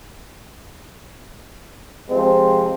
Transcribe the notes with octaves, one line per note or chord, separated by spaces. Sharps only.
C3 F3 G#3 C4